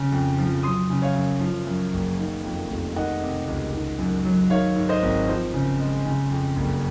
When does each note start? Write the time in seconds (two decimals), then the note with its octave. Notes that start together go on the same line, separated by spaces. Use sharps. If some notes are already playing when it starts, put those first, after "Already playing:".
Already playing: C#3
0.12 F2
0.39 F3
0.63 F#3 C6 D#6
0.90 C#3
1.02 C#5 F5
1.15 F#2
1.41 F3
1.67 F#2
1.93 F#1
2.18 D#3
2.44 F2
2.70 F1
2.96 D#3 D#5 F#5
3.22 C3
3.47 C#2
3.73 D#3
3.98 F#2
4.25 F#3
4.50 D#3 C#5 F5
4.76 G#2
4.89 C5 D#5
5.03 G#1
5.28 F3 C5
5.54 C#3
5.80 G#3
6.06 C#3
6.30 F2
6.56 F#1